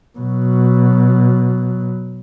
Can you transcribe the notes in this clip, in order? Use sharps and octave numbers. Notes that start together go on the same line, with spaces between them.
B2 F#3